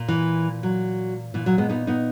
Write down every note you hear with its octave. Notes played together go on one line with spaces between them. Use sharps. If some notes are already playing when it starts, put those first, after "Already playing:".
Already playing: A#2
E3
F#3
A#2 E3
F#3
G#3 B3
B3 D#4
B3 D#4